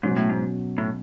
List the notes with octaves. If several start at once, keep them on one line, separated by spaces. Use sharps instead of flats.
G#2 B2 F#3 C#4
A2
G#2
A2